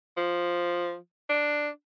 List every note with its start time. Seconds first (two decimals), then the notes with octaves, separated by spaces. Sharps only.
0.17 F3
1.30 D4